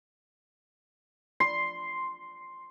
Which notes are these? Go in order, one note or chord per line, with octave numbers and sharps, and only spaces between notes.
C6